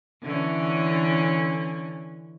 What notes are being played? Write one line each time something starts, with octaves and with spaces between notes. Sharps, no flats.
D3 E3 C#4